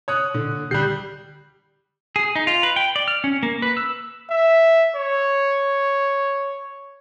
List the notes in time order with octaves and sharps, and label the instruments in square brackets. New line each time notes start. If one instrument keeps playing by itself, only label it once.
[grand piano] C#5 D#6 F#6
[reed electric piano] A#2 [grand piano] D3
[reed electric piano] D3 G4 G6 [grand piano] G3 F#6 C7
[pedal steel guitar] G#4
D#4
F4
B4
G5
D5
F6
C#4
A#3
B4
E6
[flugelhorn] E5
C#5